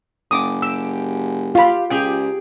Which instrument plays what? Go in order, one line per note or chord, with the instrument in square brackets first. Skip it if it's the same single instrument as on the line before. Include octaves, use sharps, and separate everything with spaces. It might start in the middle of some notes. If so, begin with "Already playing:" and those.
[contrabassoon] F#1 [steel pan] D6 D#6
[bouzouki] G4 [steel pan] E6
[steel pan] F4 B5 [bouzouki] G4 F5
[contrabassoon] C#2 [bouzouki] G4 G#4 G5